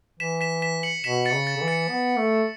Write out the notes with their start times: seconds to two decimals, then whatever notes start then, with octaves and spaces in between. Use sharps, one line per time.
0.19 E3 B6 E7
0.41 B6 E7
0.62 B6 E7
0.83 C#7 F#7
1.04 B2 B6 E7
1.25 A6 C#7
1.32 C#3
1.47 A6
1.57 C#3
1.61 E3
1.68 A6 C#7
1.90 B3
2.17 A3